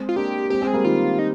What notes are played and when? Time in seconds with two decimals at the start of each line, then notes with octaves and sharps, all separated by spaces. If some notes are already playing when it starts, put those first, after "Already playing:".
Already playing: G#3 C4
0.09 F4
0.16 A#3 D4 G4
0.50 G#3 C4 G4
0.62 G#3 C4
0.67 G#4
0.73 G3 A#3
0.84 D#3 G3 F4
1.19 D#4